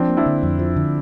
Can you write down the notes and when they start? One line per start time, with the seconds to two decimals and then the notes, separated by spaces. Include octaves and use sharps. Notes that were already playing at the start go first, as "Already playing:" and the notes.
Already playing: F3 C4 D4
0.08 A#3
0.17 D4 E4
0.26 D3
0.43 F2
0.59 F3
0.76 D3